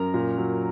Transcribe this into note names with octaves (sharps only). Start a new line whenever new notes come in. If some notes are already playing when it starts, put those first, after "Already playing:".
Already playing: F#2 A#4 A#5
A#2
F#3